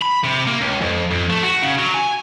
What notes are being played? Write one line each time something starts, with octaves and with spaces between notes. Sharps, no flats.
B5
C3
A#3
C#2
F2
F2
A3
F#4
C#3
F#3
G#5